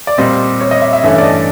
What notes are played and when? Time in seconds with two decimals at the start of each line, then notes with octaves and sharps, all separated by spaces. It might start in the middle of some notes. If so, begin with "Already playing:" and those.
0.07 D5
0.18 A#2 G3 C4 D#5
0.61 C#5
0.71 D#5
0.81 E5
0.93 E5
1.03 G2 E3 A3 C#4 E5
1.18 D5
1.24 D#5